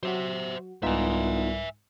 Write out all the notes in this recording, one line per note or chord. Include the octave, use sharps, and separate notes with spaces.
F#3 F#4 C5 E5
C2 G#2 B3 D#4 F4 E5 G#5